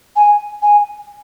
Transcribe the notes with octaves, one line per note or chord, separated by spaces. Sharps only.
G#5
G#5